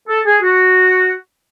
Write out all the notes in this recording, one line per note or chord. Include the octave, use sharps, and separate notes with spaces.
A4
G#4
F#4